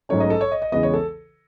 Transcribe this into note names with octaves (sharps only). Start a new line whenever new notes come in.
G#2 F#3 A3 C#4 C#5
D#5
A4
C#5
D#5
D#5
E2 C#3 E3 G#3 B3 D#5
C#5
A4